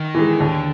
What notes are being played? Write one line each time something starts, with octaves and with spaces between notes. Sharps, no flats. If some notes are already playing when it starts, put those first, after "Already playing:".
Already playing: D#3
E3 G#3
D#2 D3